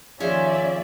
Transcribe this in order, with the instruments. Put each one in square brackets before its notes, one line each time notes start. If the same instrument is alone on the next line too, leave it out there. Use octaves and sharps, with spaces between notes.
[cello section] D#2 D5 E5 [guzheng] F3 G#4 [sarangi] C#4